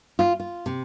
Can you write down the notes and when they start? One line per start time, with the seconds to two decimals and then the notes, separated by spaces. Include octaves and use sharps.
0.19 F4
0.40 F4
0.66 C3